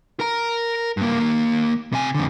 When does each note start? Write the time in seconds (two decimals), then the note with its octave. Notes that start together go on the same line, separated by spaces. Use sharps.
0.20 A#4 A#5
0.97 G2 A#3
1.20 D#2 A#3
1.93 C3 G#5
2.15 F2 D3